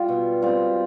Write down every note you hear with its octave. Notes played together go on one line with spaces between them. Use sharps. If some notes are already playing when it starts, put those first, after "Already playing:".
Already playing: G3 F4
B2
G3 C4 F4